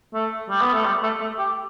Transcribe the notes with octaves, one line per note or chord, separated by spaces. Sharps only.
A3
G3
B3
A3
G3
A3
A3
G4